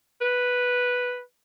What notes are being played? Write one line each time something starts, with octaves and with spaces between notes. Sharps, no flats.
B4